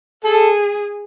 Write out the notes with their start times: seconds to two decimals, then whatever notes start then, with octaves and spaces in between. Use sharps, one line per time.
0.25 G#4 A4